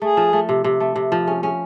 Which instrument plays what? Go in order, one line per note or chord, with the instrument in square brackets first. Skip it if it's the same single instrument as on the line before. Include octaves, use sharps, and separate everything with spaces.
[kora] A3 [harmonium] G#4
[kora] F3
A3
C3
C3
A3
C3
F3
[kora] C#4 [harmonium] G#4
[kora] C#4 [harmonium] G#4